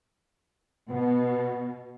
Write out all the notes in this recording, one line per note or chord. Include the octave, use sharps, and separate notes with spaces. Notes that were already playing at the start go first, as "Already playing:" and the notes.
B2 B3